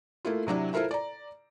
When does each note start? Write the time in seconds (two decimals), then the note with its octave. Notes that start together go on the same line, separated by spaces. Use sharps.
0.25 A3 A#3 E4 F4
0.47 C3 F#3 D4 E4
0.73 E4 F4 A4 A#4 C5 E5
0.91 D5 A#5